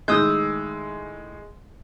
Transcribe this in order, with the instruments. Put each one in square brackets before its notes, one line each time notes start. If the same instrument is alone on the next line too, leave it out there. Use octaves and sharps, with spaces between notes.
[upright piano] A2 D#3 F#6 [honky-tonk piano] G#3 [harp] D#6 E6 G6